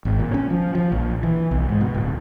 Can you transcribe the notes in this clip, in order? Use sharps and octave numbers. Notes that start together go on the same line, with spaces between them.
G#1
A#2
C#4
F3
F3
A#1
E3
B1
G#2
B2
D1